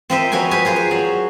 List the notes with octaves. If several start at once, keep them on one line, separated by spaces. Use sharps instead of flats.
C4 F4 A#4 C5 D#5 E5
F3 F#3 B4 D#5 G#5
G#4 B4 C5 F5 G#5
F4 G#4 A#4
C5
F#3